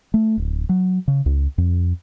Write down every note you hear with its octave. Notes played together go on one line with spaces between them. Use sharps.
A3
D1
F#3
C#3
C#2
F2